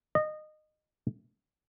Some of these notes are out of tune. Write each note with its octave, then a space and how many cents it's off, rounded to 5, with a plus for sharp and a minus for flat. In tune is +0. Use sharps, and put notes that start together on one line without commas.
D#5 -20